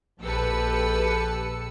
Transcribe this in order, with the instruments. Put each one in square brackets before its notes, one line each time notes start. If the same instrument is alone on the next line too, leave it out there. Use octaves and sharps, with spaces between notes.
[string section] A#1 G4 A4 B4 E6 C#7